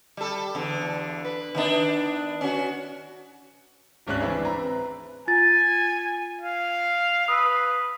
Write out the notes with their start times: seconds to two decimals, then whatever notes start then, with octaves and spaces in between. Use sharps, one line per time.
0.17 G3 A4
0.55 E2 D3
1.25 B4
1.55 D#3 B3 D4
2.41 C#4 F#4
4.07 D1 G#1 C#4 D4 F#6
4.20 E3 C4 D4 E4 G#4 B4
4.44 C4 B4 A#5
5.28 F4 G#5 A6
6.41 F5
7.28 B4 D#6 E6